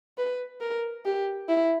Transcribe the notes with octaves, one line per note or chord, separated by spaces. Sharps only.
B4
A#4
G4
E4